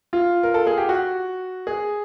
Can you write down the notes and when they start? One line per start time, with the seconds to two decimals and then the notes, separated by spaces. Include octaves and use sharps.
0.13 F4
0.43 A#4
0.54 A4
0.67 G#4
0.78 G4
0.89 F#4
1.67 G#4